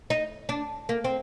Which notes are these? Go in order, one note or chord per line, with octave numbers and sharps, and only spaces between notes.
D#4
D4
A#3
C4